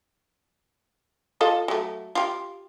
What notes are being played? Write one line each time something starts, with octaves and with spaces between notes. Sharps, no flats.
F4 A4 D#5
F#3 A3
F4 G4